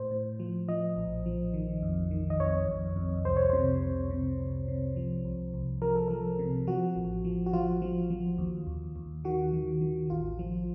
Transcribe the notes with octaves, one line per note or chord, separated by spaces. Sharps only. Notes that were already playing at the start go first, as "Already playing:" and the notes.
Already playing: A2 C5
A2
F3
F3 D#5
A#1
F3
D#3
F2
D#3
D#5
F2 C#5
F2
F2
C2 C5
C#5
C3 C5
C2
C3
C2
C3
F3
C2
C2
F3 A#4
A4
F3 A#4
C3
F3 F#4
A1
F3
F#4
F3 F4
F3
F3
D#2
D#2
D#2
D#3 F#4
D#3
D#3
A1 F4
F3